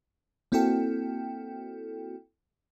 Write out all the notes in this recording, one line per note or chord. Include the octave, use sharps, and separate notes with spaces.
A#3 C4 E4 F#4 A4 G5